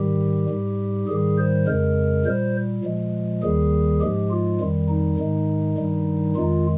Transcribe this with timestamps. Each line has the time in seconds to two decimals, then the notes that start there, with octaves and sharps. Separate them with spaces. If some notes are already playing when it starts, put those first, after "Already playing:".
Already playing: G#2 D#3 G3 G4
0.50 G#2 G3
1.08 G#2 D#3 G3 G#4
1.38 C5
1.67 F2 C#3 G#3 A#4
2.25 A#2 G3 C5
2.85 A#2 F3 G#3
3.43 D#2 D#3 G3 G#4
4.01 G#2 F3 G#3 G4
4.31 F4
4.61 F2 D#3 G3
4.89 D#4
5.18 G#2 D#3 G#3
5.78 G2 D#3 G3
6.36 F2 D#3 G#3 F4